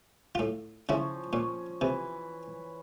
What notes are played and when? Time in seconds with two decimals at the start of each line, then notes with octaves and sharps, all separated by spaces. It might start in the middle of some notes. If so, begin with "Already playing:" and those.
0.35 A2 F4
0.89 C#3 F3 C#4 E4
1.33 A#2 C#4
1.81 C3 E3